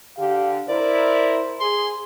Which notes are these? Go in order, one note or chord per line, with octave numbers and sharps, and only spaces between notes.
D3 G4 F5
E4 A#4 C5 D5
G#4 C6